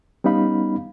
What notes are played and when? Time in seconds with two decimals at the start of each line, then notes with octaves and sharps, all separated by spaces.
0.24 G3 B3 C#4 D#4 F5 B5